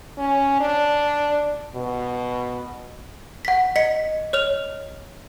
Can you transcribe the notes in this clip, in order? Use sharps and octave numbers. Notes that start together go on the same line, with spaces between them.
C#4
D4
B2
F#5 B6
D#5 B6 C#7
C#5 F6 F7